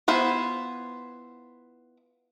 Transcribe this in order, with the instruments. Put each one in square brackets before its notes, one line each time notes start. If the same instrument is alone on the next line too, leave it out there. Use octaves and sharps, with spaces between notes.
[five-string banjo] B3 E4 F4 C5